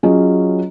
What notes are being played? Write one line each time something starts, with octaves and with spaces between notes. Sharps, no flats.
F#3 C#4 F4 G#4 D#5